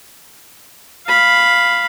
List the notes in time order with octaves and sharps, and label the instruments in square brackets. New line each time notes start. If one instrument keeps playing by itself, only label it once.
[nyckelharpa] F5 B5